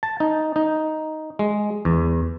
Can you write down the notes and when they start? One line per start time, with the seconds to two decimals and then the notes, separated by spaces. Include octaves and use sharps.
0.03 A5
0.20 D#4
0.56 D#4
1.39 G#3
1.85 E2